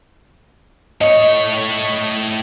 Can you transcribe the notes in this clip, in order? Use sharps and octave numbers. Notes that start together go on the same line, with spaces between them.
A2 C#5 D#5